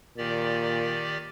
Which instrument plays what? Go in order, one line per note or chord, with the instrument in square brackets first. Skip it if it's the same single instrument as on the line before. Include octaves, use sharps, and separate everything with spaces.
[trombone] A#2 [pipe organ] D#3 G4 D5